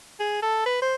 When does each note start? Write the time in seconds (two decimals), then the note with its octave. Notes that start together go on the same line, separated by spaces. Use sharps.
0.19 G#4
0.42 A4
0.66 B4
0.82 C5